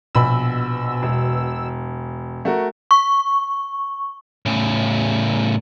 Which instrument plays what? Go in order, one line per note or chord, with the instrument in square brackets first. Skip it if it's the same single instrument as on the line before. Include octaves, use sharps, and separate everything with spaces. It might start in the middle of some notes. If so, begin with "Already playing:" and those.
[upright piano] A#1 B5 [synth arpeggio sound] B2 E6
[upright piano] E1
A3 F#4 A#4
[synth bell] C#6
[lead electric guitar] A2 C#3